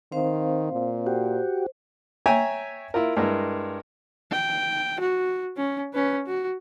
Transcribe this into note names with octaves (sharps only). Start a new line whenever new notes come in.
D#3 C4 C5 F5
A#2
F#4 G4 C5
C#5 E5 G5 G#5 A#5
E4 F4 A#4
G2 G#3 E4 A#4
G5
F#4
C#4
C#4 B4
F#4